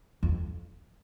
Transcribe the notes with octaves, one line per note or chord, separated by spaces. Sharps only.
F2